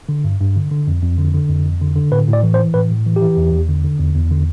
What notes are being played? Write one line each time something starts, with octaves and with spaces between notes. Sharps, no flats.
D3
G2
G2
D3
D3
F2
F2
D3
D3
F2
F2
D3
D3
A2 B4
A2
D5
E3
C5
E3
A2 B4
A2
E3
G4
E3
E2
E2
D3
D3
E2
E2
D3